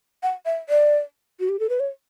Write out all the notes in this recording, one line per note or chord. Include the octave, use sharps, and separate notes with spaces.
F#5
E5
D5
F#4
G4
A4
B4
C#5